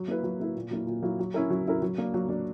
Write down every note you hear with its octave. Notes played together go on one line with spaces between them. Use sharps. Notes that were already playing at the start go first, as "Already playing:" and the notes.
Already playing: F#3
A#3 E4 B4
F#3
A#3 E4 B4
A#2
F#3 A#3 E4
A#2
F#3 A#3 E4
F#3
C#4 E4 A#4
F#3
C#4 E4 A#4
F#3
A#3 D4
F#3
A#3 D4